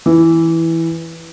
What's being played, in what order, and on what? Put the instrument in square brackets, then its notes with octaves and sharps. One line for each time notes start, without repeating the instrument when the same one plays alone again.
[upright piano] E3